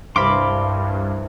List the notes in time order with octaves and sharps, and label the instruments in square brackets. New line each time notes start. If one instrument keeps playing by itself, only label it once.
[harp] C2 A5 A#6 [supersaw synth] G2 [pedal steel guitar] F5 C6 [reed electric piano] B5 D6